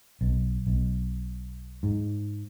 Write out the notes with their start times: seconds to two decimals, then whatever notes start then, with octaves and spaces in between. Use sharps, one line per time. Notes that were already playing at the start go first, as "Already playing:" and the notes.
0.21 B1
0.67 B1
1.83 G#2